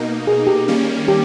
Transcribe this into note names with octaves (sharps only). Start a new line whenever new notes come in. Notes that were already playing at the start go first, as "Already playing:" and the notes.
Already playing: B2 A#3 D#4
G#4
G4
D#3 G3 A#3 C#4
G4